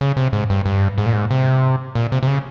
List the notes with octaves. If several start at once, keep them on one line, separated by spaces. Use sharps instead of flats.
C#3
C3
G#2
G2
G2
G#2
A#2
G#2
C3
A#2
C3
C3
C#3